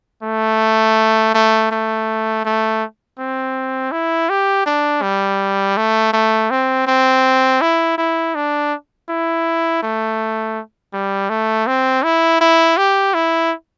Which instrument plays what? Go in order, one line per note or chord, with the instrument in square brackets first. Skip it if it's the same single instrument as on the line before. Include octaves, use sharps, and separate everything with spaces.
[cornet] A3
A3
A3
A3
C4
E4
G4
D4
G3
A3
A3
C4
C4
E4
E4
D4
E4
A3
G3
A3
C4
E4
E4
G4
E4